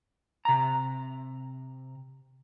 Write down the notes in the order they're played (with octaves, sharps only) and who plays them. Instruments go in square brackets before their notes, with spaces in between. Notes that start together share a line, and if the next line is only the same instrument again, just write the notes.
[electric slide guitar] C3 A#5